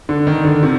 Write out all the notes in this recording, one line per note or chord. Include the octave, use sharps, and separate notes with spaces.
D3
D#3
D3
C3